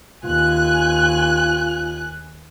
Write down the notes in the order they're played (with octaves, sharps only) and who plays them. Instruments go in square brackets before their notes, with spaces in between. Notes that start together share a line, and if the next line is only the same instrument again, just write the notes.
[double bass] D#2 [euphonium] F4 [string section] G#5 F#6